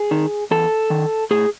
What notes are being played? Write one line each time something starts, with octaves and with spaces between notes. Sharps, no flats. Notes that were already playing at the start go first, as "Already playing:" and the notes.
Already playing: G#4
D#3
E2 A4
D#3
A2 G#4